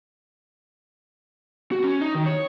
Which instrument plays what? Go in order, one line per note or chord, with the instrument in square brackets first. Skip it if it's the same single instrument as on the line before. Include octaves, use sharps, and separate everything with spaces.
[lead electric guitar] F#4
C#4
D#4
D#3
C#5